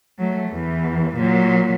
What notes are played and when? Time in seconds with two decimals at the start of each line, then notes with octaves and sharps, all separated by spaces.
0.19 F#3 A3
0.49 E2 E3
1.16 A#2 F#3